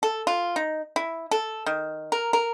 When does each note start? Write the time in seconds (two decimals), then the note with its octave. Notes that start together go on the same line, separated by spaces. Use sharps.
0.03 A4
0.27 F4
0.56 D#4
0.96 E4
1.31 A4
1.66 D#3
2.12 A#4
2.33 A#4